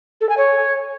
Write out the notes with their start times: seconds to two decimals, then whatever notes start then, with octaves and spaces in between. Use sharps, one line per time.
0.21 A4
0.29 G#5
0.37 C#5